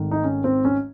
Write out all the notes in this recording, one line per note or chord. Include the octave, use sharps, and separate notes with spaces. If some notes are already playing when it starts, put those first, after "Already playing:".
Already playing: G#1 G#2 D#3 A3
D#4
C#4
C4
C#4